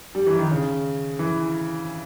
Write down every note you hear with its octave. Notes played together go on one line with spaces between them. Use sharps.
G3
E3
D#3
C#3
E3